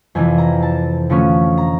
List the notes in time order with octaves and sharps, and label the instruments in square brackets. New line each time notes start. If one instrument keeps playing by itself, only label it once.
[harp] F2 C3 E3 G#5
A#5
A5
D3 F3 A3 C#4
A#5